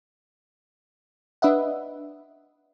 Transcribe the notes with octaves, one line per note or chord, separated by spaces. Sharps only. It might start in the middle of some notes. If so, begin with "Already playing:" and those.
D4 B4 D#5 E5 F#5